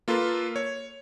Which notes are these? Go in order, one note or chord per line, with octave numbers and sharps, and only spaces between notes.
A#3 F4 A4 B4
C#5